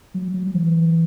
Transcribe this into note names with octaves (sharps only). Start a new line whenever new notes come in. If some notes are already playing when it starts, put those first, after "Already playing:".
F#3
F#3
F#3
E3